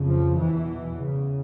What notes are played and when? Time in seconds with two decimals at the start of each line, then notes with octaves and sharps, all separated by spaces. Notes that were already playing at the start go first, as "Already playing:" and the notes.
Already playing: F2 C#3
0.10 F3
0.38 E2 B2 E3
0.96 E2 C#3